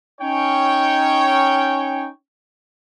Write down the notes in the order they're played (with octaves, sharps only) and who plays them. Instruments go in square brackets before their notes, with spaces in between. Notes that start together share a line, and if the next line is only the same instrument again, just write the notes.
[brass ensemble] C#4 D#4 C#5 G5